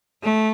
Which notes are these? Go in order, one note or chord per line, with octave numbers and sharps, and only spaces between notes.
A3